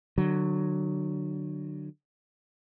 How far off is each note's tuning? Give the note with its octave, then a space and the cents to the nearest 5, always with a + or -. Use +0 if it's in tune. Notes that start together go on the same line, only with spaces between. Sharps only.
D3 +25 F#3 +0